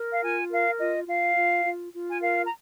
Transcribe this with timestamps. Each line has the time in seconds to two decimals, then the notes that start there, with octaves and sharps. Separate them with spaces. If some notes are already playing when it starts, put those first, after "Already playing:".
Already playing: A#4
0.12 F5
0.22 F4 G#5
0.50 A#4 F5
0.78 F4 D#5
1.07 F4 F5
1.35 F4
1.64 F4
1.92 F4
2.09 G#5
2.20 A#4 F5
2.44 A#5